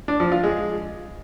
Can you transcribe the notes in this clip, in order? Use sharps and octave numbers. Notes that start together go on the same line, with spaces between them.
D4
F3
F4
G#3